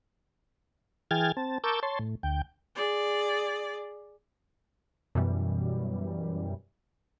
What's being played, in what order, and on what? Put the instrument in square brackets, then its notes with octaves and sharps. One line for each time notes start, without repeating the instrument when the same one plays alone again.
[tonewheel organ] E3 G#4 G5 F6 G#6 A6
C4 A5
A#4 A5 C#6 D6 E6 G6
C#5 A5 C6
A2
D2 G5
[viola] G#4 D5
[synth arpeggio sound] F#2 B2 E3 G3